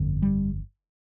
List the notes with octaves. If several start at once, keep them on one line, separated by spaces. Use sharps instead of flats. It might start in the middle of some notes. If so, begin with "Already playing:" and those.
Already playing: G1 F2 D3
G3